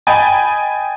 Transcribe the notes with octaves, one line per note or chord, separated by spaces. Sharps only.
D#5 G5 G#5 B5 A6